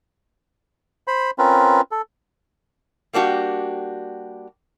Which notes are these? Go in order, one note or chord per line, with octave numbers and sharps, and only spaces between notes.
C5 B5
C4 C#4 F4 A#4 B4
A4
G3 A#3 D4 F#4 G4